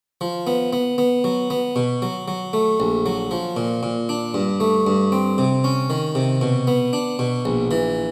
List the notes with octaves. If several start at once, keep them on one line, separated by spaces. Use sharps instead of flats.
F3
B3
B3
B3
F#3
B3
B2
F#3
F#3
A3
A#1
F#3
F3
A#2
A#2
D4
G2
A3
G2
C4
C3
C#4
D#3
C3
B2
B3
D4
B2
A#1
E3